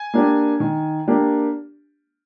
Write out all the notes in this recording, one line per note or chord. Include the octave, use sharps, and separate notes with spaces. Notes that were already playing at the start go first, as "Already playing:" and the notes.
Already playing: G#5
A#3 D4 G4
D#3
A#3 D4 G4